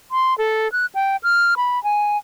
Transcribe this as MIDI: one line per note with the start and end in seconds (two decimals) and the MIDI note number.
0.11 0.37 84
0.38 0.70 69
0.72 0.86 90
0.95 1.16 79
1.23 1.54 89
1.57 1.82 83
1.84 2.17 80